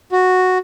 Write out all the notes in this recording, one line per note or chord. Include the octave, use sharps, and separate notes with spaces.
F#4